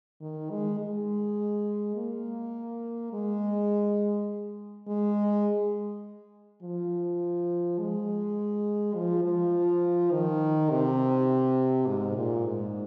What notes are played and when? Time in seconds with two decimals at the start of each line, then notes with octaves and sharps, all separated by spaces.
0.21 D#3
0.51 G#3
0.79 G#3
1.96 A#3
3.13 G#3
4.87 G#3
6.62 F3
7.79 G#3
8.95 F3
9.24 F3
10.11 D#3
10.70 C3
11.87 G#2
12.15 A#2
12.45 G#2